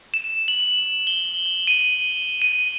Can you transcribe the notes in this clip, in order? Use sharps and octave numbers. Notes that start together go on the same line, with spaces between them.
E7
F#7
G7
D#7
D#7